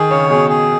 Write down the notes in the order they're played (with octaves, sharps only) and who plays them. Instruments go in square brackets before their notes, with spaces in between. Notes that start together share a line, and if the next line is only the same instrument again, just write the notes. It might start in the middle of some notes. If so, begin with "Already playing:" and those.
Already playing: [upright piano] D#3 [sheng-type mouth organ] G#4
[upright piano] C#3 [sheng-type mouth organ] C#5
[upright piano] B2 [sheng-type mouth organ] G#4
[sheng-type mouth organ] G#4